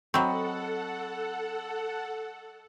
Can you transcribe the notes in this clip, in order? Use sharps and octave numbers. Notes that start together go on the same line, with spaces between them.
F#3 C4 A4 D#5 F#5 B5 C#6